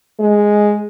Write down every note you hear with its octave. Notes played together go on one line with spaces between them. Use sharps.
G#3